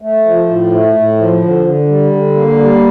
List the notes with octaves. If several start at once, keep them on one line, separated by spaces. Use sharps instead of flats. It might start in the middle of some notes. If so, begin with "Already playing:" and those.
A3
F3
A2
A3
A2
F3
D3
D3
G3
D3
A#3
G3